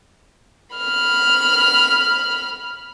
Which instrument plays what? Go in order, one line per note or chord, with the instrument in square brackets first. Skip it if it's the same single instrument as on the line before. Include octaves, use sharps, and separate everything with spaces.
[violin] B5 F6